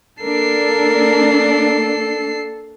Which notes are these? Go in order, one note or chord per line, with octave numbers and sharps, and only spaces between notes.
A#3 D4 A4 A#4 C7